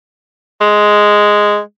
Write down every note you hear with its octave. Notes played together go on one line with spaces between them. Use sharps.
G#3